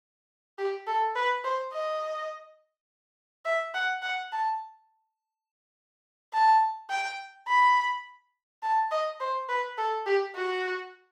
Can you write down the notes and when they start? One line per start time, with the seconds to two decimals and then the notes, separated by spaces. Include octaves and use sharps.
0.58 G4
0.87 A4
1.16 B4
1.44 C5
1.73 D#5
3.45 E5
3.74 F#5
4.02 F#5
4.32 A5
6.33 A5
6.90 G5
7.48 B5
8.63 A5
8.91 D#5
9.20 C5
9.49 B4
9.78 A4
10.06 G4
10.35 F#4